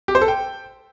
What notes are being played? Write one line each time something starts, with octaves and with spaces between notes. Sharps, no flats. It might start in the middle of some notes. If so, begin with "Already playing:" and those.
G4
C5
A4
G5